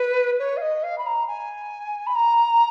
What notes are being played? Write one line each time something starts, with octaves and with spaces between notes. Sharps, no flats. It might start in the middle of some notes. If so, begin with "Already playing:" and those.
Already playing: B4
C#5
F5
D#5
F5
B5
A#5
G#5
B5
A#5